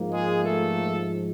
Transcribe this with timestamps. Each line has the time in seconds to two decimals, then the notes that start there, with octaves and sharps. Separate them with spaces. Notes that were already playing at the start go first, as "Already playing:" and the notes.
Already playing: G#2 F3 A#3
0.12 G#3 G#4
0.44 A3 A4